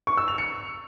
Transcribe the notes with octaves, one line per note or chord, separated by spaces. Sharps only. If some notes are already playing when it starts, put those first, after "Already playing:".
C#6
E6
F7
C#7